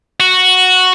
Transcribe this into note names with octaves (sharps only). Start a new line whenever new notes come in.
F#4